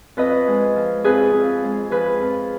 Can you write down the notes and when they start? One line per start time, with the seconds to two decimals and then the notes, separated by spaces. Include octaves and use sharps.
0.17 F2 B4 D#5
0.48 G#3
0.76 F3
1.04 F2 G#4 B4
1.34 F2
1.63 G#3
1.91 F3 G#4 B4
2.20 F2